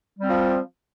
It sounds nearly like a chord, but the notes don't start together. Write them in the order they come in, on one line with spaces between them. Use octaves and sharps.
G3 C4 F3